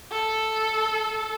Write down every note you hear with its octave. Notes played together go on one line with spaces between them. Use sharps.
A4